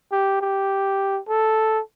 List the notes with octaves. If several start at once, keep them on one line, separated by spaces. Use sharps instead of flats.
G4
G4
A4